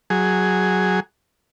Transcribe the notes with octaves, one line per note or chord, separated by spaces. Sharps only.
F#3 G#4